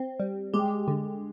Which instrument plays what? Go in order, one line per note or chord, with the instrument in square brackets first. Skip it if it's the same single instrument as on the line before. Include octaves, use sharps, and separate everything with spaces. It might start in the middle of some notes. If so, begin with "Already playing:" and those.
Already playing: [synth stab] C4
G3
[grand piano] G#3 [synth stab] G4
[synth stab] D3